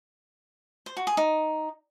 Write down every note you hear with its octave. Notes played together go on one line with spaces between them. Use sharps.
C5
F#4
G#4
D#4